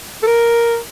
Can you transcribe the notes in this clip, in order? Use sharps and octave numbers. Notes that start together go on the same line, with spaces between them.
A4
A#4